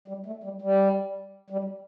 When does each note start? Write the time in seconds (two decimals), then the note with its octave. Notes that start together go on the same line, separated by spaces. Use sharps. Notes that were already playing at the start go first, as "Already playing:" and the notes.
0.08 G3
0.26 A3
0.44 G3
0.62 G3
1.50 G3